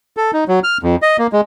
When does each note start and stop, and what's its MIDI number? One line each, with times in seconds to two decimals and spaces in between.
0.17 0.31 69
0.33 0.44 63
0.48 0.60 54
0.64 0.78 89
0.83 0.96 41
1.02 1.17 75
1.19 1.27 58
1.33 1.41 56